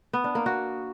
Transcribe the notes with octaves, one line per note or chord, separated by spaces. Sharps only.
B3
D4
A#3
F#4